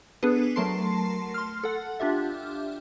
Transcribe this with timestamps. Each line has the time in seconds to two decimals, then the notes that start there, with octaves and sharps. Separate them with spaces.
0.23 B3 D4 G#4 A4 B4
0.56 F#3 A3 A#4 A5 C6 C7
1.34 C6 F6
1.63 A4 F#5
2.00 D4 F4 G4 E5